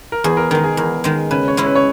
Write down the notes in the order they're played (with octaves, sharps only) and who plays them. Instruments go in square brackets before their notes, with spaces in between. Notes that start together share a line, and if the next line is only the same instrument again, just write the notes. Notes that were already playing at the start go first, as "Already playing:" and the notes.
[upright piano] A#4
[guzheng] E2 [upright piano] G#4
[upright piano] A#4
[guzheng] D#3 G#3 [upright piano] A#4
[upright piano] G#4
[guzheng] E2 [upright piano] A#4
[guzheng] D#3 G#3
[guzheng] C#3 [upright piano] B4
[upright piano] C#5
[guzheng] G#3 C#4 E4
[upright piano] B4
C#5